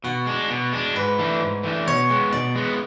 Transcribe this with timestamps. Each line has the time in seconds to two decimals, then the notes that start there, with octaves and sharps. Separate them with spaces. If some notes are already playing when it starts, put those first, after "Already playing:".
0.04 B2 F#4
0.27 G#3 D4
0.50 B2
0.73 G#3 D4
0.95 G#2 B4
1.18 E3 A3 D4
1.42 G#2
1.64 E3 A3 D4
1.87 B2 C#5
2.10 G#3 B3
2.32 B2 D5
2.55 G#3 B3